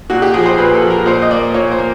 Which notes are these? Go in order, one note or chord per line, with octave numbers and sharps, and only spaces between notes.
A#2 F#4
G4
F3 G#4
C5
A#2 B4
A4
F3
A#4
A#2 C5
D#5
A#3 D5
A#2 C#5
C5
A#3